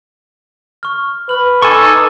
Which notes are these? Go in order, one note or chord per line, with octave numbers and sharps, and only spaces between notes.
C#6 F6
B4 F6 F#7
D#4 A4 G#5 C#6 D6